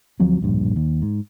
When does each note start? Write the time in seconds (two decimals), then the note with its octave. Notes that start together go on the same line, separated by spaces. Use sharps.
0.20 D2 F3 F#3 C4
0.41 D1 A#1 G2
0.76 D#2
1.02 G#2